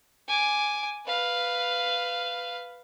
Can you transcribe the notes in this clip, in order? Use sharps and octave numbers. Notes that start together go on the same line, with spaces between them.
G#5 D6
B4 F5